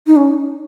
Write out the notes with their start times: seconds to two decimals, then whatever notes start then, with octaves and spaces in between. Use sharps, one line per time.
0.07 D#4
0.16 C#4